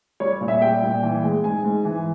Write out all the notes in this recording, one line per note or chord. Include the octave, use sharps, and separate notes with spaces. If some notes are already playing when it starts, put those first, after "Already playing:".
G3 C#5
A#2
E5
G3 G5
A#2
E3
G#3
G#2 G#5
G#2
E3